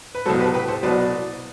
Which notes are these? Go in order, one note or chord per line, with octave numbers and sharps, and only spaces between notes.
B4
C2 B2 F#3 A4 C5
G4 B4
G4 B4
A4 C5
C2 B2 F#3 B4 D5